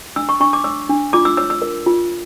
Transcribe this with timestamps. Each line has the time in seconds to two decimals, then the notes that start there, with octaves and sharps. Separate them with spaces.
0.16 D4 E6
0.29 C#6
0.40 D4 C#6
0.53 D6
0.64 C#5 E6
0.89 D4
1.13 F4 D6
1.25 E6
1.37 C#5 E6
1.50 E6
1.62 A#4
1.86 F4